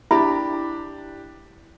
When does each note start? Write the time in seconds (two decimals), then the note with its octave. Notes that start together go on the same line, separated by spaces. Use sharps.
0.11 D4 E4 G4 E5 B5